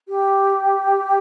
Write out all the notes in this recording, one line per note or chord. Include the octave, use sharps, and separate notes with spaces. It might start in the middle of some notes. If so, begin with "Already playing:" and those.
G4